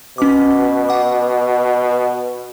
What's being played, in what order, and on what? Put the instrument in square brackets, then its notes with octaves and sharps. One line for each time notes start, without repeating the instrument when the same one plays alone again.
[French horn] B2 [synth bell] C#4 D6
[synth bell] F#5 D6